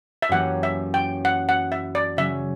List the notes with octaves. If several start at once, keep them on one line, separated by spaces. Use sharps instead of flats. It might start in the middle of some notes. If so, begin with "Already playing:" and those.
E5
F#2 E3 A#3 C#4 G4 F#5
E5
G5
F#5
F#5
E5
D5
C#3 F#3 C#4 E5